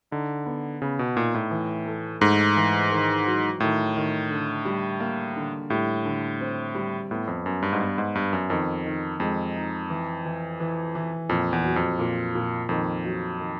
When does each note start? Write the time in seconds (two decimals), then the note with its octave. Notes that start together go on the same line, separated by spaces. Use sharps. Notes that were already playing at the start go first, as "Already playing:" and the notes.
0.11 D3 D#4
0.46 B3
0.82 C#3 B3
0.99 B2
1.16 A#2 D#4
1.34 A2
1.51 E3
1.86 A3
2.21 G#2 A3
2.56 E3
2.91 D#3
3.26 F#3
3.60 A2 D#3
3.96 D#3
4.31 D3
4.65 G3
5.00 A#3
5.36 D3
5.70 A2 G3
6.05 D3
6.40 C4
6.75 G3
7.11 A2 B3
7.27 F2
7.45 F#2 B3
7.62 G2
7.73 G#2
7.80 G2 B3
7.98 G#2
8.15 G2 B3
8.33 F#2
8.50 F2 D#3
8.86 D#3
9.20 F2 G#3
9.55 D#4
9.90 E3
10.25 E3
10.60 E3
10.95 E3
11.29 F2 A#2
11.53 E2
11.65 F#3
11.76 F2
11.99 A#2
12.35 A#2
12.69 F2 D#3
13.05 F#3
13.39 D#3